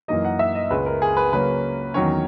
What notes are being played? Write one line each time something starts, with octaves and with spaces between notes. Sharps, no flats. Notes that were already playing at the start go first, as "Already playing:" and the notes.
F#2 E3 A#3 D#4 D#5
F#5
E5
D#5
C#2 C#3 G#3 B4
A#4
G#4
B4
C#3 F#3 A#3 C#4 B4
E2 D#3 F#3 C#4 C#5